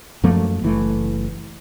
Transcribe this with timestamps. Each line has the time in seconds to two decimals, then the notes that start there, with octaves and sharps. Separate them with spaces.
0.23 F#2 F3 A3 A#3
0.62 F#1 E3 A3